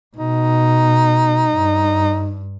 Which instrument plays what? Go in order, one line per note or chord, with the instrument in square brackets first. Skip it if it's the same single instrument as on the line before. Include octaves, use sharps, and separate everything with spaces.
[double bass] B2 [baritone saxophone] D#4
[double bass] G2